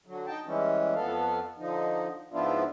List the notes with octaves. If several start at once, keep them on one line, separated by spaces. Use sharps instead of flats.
D3 F#3
D#4 G5 A5
E3 G3 G#3 C#4
F2 B3 A4 F5
D3 F3 D#4
G#2 F3 B3 D4 E4 F4